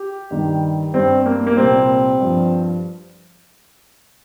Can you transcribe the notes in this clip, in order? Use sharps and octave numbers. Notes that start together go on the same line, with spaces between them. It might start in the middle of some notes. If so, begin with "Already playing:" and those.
Already playing: G4
G2 D#3 G3
G2 G3 C4
A#3
A#3
C2 A#2 G3 C4
G2 F3